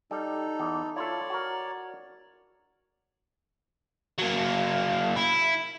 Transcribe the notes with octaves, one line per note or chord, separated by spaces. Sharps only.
G3 D#4 A4
E2
E4 F4 A4 C#5 D5
F#4 A#4
F#3 A#3
E4